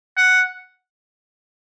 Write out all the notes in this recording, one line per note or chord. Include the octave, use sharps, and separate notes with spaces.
F#5